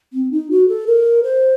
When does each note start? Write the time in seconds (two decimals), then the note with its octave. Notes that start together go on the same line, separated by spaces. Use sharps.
0.13 C4
0.32 D#4
0.51 F#4
0.68 A4
0.87 A#4
1.24 C5